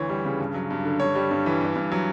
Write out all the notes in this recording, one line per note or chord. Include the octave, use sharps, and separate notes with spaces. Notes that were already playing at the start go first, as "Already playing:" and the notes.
Already playing: D2 E3 C#5
G3
C#3
G2
F#3
G2
D3
G2 C#5
G3
G2
E3
G2
G2
F#3